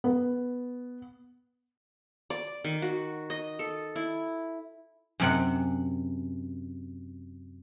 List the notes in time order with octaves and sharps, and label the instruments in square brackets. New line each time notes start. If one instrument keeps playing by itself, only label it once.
[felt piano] B3
[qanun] D5
D#3
F#4
D#5
A4
E4
[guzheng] F#2 C3 F#5